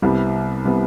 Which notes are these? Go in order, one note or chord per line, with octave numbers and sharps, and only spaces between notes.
C2 C3 G3 B3
C3 G3 B3